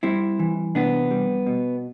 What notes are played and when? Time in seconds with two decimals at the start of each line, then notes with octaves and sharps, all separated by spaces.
0.03 G3 C4 E4
0.39 E3
0.75 C3 B3 D4
1.11 G3
1.46 B2